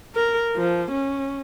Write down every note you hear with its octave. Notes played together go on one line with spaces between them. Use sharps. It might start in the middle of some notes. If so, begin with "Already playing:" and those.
A#4
F3
C#4